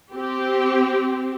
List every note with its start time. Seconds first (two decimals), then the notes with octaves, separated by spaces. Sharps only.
0.14 C4 G4